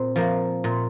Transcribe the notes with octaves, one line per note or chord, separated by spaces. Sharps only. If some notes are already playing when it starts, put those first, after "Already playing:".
Already playing: A#2 C4
F3 A#3
A#2